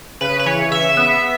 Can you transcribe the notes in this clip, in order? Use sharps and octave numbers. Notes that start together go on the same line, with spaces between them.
C#3 B4
B4
E3 C#5
C#3 E5
B3